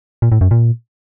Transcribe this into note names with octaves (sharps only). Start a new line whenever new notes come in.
A#2
A2
F#2
A#2